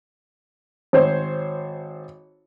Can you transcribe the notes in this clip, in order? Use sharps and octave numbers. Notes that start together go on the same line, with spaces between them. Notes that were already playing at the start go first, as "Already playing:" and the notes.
G#1 C5 C#5